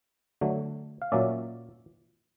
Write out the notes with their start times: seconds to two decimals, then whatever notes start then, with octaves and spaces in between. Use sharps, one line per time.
0.41 D3 F#3 A3
1.02 F5
1.12 A#2 F#3 A#3 C#4 D5 E5